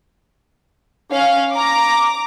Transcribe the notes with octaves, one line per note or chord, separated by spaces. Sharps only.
C#4 F5
A#5 D6